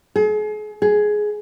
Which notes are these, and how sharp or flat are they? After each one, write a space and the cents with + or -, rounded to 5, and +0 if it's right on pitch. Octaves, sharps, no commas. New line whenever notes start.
G#4 +40
G#4 +10